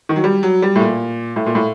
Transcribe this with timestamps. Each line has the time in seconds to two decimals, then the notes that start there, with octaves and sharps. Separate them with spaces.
0.09 D#3
0.16 F#3
0.24 G3
0.43 F#3
0.62 G3
0.76 A2
0.80 A#2
1.36 A2
1.46 A#2
1.55 A2